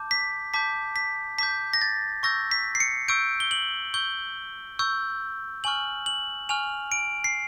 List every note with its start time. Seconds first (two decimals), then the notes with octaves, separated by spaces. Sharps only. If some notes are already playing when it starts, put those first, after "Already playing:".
Already playing: A5 D6 G6
0.11 B6
0.54 A5 D6 G6 B6
0.96 B6
1.38 A5 D6 G6 B6
1.73 A#6
1.81 A6
2.23 C#6 E6 G6 A#6
2.51 B6
2.75 C7
2.80 C#7
3.08 C#6 E6 G6 D7
3.40 G7
3.51 F#7
3.94 C#6 E6 G6 G7
4.79 C#6 E6 G6
5.64 G#5 C#6 F6 F#7
6.06 F#7
6.49 G#5 C#6 F6 F7
6.92 D7
7.24 C7